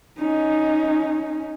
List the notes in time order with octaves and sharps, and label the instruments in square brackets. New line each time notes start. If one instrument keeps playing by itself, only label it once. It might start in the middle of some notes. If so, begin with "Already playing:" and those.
[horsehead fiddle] C#4 D#4